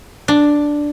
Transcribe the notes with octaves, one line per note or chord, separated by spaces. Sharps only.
D4